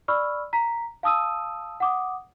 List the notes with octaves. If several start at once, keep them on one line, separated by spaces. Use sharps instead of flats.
D5 B5 C#6 E6 F6
A#5 B6
F5 A5 D#6 E6 D#7
F#5 D6 D#6